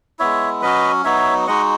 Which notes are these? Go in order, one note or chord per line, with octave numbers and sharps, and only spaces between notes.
G#3 B3 E4 C#5 E5
F#3 C#4 F#4 B4 D#5
F#3 B3 D#4 F#4 C#5 E5
G#3 D#4 F#4 D#5 F#5